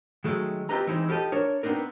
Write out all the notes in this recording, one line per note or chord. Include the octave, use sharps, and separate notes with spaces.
D#3 F#3 G#3 A3
C4 F4 G4 B4 D#5 A#5
E3 G#3 C4 D#4 E4
F3 G4 A4 D#5
D4 A#4 C#5
B3 C4 D4 D#4 A#4